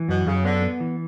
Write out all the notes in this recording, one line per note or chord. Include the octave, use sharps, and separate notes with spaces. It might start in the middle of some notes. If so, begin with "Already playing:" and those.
Already playing: E3
F#2 B2
F#2 C#3
D3 B3
B3
E3